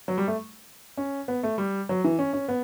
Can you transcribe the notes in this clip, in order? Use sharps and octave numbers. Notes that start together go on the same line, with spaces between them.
F#3
G3
A3
C#4
B3
A3
G3
F#3
E3
C#4
C#4
B3